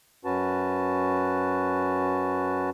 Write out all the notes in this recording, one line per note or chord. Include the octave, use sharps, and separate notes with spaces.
F#2 C#4 F#4 B4 A5